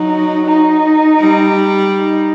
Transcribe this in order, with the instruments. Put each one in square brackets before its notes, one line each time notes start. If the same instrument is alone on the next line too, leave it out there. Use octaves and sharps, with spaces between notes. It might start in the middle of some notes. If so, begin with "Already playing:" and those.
Already playing: [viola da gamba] F#3 [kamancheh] D#4
[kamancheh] D#4
[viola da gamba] G3
[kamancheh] D#4